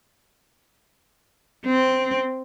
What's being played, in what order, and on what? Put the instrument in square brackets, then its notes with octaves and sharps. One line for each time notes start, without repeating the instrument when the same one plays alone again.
[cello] C4